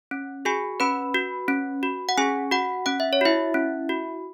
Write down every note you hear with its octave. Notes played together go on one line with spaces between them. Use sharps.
C#4
F#4 G#4 G#5
C#4 B4 B5
F#4
C#4
F#4
F#5
C#4 G#4 G#5
F#4 F#5
C#4 F#5
E5
C#5
E4 F#4 E5
C#4
F#4